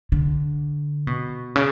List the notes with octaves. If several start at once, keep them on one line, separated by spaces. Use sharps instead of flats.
D3
B2
C#3